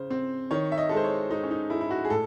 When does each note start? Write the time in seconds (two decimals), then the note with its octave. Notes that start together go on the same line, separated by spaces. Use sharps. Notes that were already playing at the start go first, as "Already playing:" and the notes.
Already playing: C#3 C5
0.11 C4
0.51 D#3 C#5
0.72 E5
0.78 D#5
0.89 G#3 A4
0.97 C5
1.04 C#5
1.30 G#3 D#4
1.43 C#4
1.51 D#4
1.70 G#3 E4
1.81 E4
1.90 F#4
2.05 G#4
2.10 A2 A4